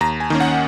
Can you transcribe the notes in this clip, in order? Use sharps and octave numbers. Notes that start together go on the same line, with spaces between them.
D#2 A#5
G#5
D#3 A#3 C#4
F#5